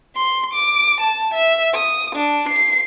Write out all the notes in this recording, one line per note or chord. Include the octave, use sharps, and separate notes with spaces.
C6
D6
A5
E5
D#6
D4
C7